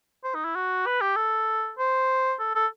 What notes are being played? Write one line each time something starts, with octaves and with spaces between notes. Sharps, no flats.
C5
D#4
E4
F#4
B4
G4
A4
C5
A4
A4